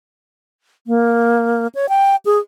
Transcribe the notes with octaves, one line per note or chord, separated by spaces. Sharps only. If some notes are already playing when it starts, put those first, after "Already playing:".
A#3
C#5
G5
G#4